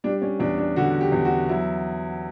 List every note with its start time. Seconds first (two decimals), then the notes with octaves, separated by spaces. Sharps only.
0.04 G3 D4
0.22 C#4
0.40 E2 D4
0.58 D4
0.76 D3 F#4
1.01 G4
1.12 E2
1.25 F#4
1.49 F#3 E4